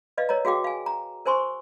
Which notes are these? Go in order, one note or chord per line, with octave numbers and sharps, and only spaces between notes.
B4 D5 D#5 F5
A#4 C#5 D#5 A#5
F#4 G#4 F5 G5 D6
F5 G#5
A#5
A#4 C5 G#5 C6 C#6